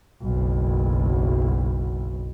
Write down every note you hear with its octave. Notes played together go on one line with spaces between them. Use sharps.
F#1 B1